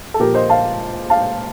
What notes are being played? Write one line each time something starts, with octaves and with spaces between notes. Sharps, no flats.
A4
A#2 F3 G4 A#4
C5 D#5
F5 A5
F5 A5